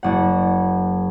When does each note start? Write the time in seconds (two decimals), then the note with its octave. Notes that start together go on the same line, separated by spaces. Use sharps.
0.03 F#1 F#5